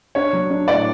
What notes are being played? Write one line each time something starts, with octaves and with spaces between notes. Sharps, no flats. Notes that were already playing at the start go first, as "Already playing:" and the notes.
D4 C#5
F#3
D4
A2 D5